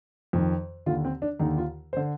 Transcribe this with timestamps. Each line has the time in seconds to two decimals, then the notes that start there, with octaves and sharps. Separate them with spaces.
0.33 F2 D#3
0.86 D#2 D3 F4
1.05 C4
1.22 D4
1.39 D#2 D3 D#4
1.58 F4
1.93 C5
1.97 D3